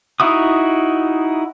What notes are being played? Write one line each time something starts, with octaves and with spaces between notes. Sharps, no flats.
D#4 E4 F#4 D#6